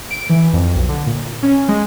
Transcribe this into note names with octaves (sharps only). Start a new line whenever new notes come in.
D7
E3
F2
B1
D3
A#2
C#4
G#3